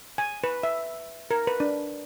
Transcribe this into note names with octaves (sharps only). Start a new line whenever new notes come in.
G#5
B4
E5
A#4
B4
D4